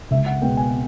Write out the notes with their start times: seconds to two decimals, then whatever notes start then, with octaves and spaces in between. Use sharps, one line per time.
0.11 C#2 E5
0.26 F#5
0.42 B2 G#3 B3 G5
0.57 G#5